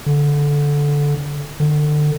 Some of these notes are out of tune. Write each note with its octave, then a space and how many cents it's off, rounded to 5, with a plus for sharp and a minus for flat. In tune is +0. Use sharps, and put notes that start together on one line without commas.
D3 -15
D3 +30